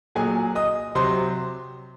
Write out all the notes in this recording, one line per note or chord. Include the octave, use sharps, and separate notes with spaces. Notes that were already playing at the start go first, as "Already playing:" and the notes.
A#2 F#3 G#4 G#5
D#5 D#6
C3 F#3 C5 C6